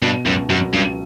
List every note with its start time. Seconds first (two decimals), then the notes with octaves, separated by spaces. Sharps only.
0.02 G2 B2
0.26 C#2 F#2
0.50 F#2 F#3
0.74 C#2 G2